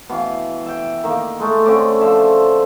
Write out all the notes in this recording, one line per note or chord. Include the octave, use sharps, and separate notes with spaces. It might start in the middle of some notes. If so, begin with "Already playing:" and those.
B2 E3 F5
E5 G5
D#3 A#3
G#3 A3
D3 C4 C#4 D6
F3 E5